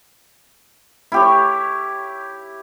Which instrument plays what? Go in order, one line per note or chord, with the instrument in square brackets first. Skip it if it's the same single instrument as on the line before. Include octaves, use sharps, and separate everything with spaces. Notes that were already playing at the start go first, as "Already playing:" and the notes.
[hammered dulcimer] E4 G4 C#5